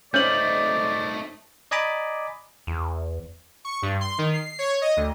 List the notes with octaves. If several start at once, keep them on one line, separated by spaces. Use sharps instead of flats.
A3 C#4 D#4 C5 D5 G6 F#7
D5 D#5 G#5 A#5 B5 D6
E2
C#6
G2
C6
D#3
C7
C#5
D#5
D2